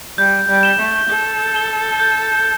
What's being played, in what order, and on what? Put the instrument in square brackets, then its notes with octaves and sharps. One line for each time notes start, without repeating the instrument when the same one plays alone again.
[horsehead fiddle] G3 [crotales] G6
[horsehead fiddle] G3
[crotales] E7 G7
[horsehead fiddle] A3
[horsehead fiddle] A4 [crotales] G6
[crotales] E7 G7
G6